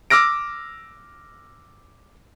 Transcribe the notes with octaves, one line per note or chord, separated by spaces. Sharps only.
D6 E6 F6 A#6 D7